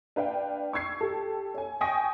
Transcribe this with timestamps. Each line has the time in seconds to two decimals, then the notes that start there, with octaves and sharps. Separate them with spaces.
0.16 D4 B4 F5 G5
0.73 C#6 E6 G#6 C7
1.01 G4 A4
1.54 C#5 G#5
1.81 G5 G#5 C#6 D#6 A#6